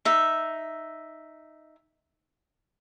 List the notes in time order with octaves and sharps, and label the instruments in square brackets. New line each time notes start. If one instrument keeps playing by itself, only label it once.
[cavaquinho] D#4 E5